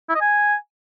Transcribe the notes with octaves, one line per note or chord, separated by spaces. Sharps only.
E4
D#5
G#5